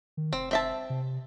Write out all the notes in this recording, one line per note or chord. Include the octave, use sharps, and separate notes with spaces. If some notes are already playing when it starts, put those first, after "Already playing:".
D#3
F1 C4
C4 E5 A5
C3